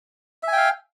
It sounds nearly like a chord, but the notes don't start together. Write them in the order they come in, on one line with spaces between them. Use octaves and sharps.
E5 G#5 G5 F5